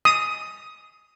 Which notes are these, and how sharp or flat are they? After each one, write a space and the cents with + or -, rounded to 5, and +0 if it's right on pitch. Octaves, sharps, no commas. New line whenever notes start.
D#6 +10